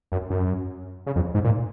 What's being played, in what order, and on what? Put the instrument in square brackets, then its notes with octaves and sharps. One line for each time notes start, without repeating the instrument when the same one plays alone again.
[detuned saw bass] F#2
F#2
C#3
F2
G#2
A#2